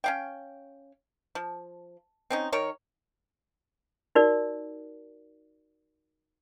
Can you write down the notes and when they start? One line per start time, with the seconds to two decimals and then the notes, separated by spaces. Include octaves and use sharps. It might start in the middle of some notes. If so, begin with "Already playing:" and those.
0.04 C#4 F5 G5
1.35 F3
2.30 C4 C#4 D#4
2.52 D#3 A#4 C#5
4.15 D#4 F#4 A#4 D5